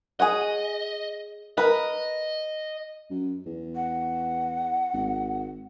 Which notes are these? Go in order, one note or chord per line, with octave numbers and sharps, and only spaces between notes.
G#4 C#5 D#5 F#5
A#4 B4 D#5
F#2
E2
F#5
G#1